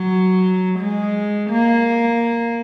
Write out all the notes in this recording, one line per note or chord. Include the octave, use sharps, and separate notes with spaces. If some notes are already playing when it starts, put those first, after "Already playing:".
Already playing: F#3
G#3
A#3